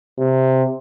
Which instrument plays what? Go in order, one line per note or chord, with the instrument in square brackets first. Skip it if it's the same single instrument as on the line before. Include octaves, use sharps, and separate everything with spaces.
[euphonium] C3